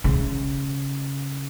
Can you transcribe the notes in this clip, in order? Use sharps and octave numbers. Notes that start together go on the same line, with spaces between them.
C#3